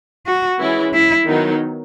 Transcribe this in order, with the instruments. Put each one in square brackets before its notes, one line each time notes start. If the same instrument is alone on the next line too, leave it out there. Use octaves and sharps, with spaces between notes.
[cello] F#4
[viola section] E3 G#3 C#4 E4
[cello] E4
[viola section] D#3 F#3 B3 D#4